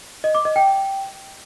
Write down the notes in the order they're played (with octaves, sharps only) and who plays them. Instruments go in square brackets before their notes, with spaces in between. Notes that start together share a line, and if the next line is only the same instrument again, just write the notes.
[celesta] D#5
D6
D#5
G5